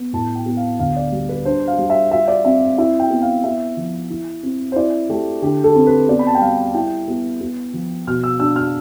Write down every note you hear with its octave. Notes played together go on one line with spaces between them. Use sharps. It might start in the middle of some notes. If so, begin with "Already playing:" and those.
Already playing: B3
A2 A5
G5
B3
F5
D2 F5
D5
G3
B4
D4 C5
F5
G3
E5
F4 E5
D5
C4 E5
E4 E5
G5
B3
F5
B3 E5
F3
E4
C4
C5
E4 D5
A3 G4
D3 G4
A4
C4
B4
B3 D5
B5
A5
G5
G3 F5
E4 G5
B3
B3
F3
B2 F6
E6
D4 E6
F6